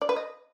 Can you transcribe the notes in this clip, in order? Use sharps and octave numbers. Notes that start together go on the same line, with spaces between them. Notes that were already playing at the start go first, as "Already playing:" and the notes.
D5
B4
D#5